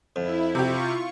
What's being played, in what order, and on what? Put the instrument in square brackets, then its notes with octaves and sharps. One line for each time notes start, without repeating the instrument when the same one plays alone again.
[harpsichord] F2 [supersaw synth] E4
[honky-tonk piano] C3 G4 [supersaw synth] F4 C#6